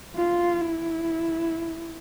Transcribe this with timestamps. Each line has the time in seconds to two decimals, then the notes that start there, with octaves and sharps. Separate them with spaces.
0.17 F4
0.61 E4